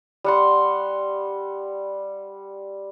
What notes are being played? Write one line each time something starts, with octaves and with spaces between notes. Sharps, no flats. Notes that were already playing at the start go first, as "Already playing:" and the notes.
G3 F#5 C6